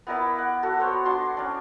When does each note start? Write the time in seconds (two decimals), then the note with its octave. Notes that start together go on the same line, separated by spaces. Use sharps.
0.07 B3 E4 A#4 D5
0.38 F#5
0.63 F#4 A4
0.79 B3 C5 C#5
1.05 D4 F#4 A5 C6
1.37 C#4 D4